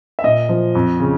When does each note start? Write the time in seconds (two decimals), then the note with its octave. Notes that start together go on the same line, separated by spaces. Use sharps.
0.19 E5
0.24 A#2 D#5
0.49 F3
0.75 F2
1.00 C#3